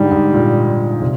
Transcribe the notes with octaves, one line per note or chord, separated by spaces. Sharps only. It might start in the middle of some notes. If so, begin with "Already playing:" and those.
Already playing: G#2 D3 G3
G#2
A#2
C3